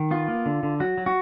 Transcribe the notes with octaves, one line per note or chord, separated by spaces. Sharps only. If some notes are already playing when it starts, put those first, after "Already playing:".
Already playing: D#3
B3 F4
A#3
D3
D3
F#3 F#4
F#3
F#4